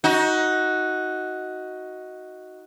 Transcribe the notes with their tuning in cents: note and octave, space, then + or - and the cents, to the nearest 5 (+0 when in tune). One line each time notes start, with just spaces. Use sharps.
D#4 +15 F#4 +0